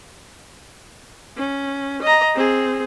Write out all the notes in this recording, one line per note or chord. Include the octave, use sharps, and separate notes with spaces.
C#4
D#5 A#5
C4 G#4